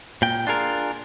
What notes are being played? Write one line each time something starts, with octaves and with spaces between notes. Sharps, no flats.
A#2 G5
D4 F4 G#4 A#4